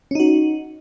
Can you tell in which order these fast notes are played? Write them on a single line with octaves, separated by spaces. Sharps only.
C#4 D#4 F#4